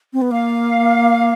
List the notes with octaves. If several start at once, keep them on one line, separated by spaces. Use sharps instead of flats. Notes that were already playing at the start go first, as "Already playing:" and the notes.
C4
B3
A#3 F5